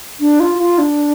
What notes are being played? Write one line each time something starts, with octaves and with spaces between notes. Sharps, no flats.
D4
F4
F4
D4